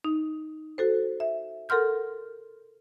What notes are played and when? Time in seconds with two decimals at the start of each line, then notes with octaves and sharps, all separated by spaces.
0.04 D#4
0.78 F#4 A4 C5
1.20 E5
1.69 A4 A#4 F#5 C6 F6 G6